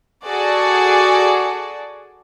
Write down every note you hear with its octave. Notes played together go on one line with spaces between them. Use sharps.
F#4 G#4 A4 D5